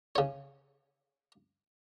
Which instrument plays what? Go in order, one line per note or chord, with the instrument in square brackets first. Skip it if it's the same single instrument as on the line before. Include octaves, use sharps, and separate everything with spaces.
[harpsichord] C#3 C#5